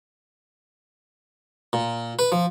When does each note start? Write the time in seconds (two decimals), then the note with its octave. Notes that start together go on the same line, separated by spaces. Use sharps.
1.73 A#2
2.19 B4
2.32 F3